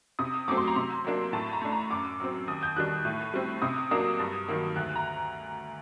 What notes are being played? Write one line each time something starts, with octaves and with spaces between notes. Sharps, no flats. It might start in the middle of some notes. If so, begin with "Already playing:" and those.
C3 D#6
F#3 A3 C4 D6
C6
A#5
C3 C6
F#3 A#3 D4
A2 A5
A#5
A3 D4
A#5
F#2 D6
F#3 C4
D#2 D#6
G6
D#3 G3 D4 F#6
A2
G3 C4
C3 D#6
F#3 A#3 D4 D#6
G2
D#3 F#3 A#3
D2 F#6
A#5